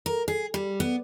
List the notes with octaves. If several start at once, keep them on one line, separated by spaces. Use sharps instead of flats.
A#4
G#4
G3
B3